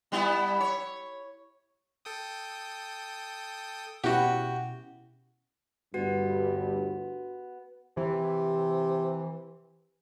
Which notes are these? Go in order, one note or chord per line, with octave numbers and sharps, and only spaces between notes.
G3 B3 E4
C#5
A4 G5 D#6
B2 C#4 E4 F#4 G4 F#5
G1 D2 G2 B3 F#4
C3 E3